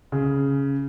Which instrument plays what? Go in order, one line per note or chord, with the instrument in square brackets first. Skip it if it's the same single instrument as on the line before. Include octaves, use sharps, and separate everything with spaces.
[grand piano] C#3